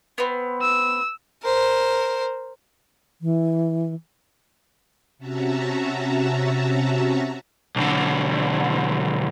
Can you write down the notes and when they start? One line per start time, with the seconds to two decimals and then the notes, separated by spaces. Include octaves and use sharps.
0.18 B3 C4
0.62 E6
1.43 A#4 C5
3.21 E3
5.18 C3 C#4 F#4 E5 A5 A#5
7.76 B1 D3